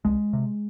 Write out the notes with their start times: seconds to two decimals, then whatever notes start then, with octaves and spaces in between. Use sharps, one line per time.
0.05 C2 G#3
0.33 C3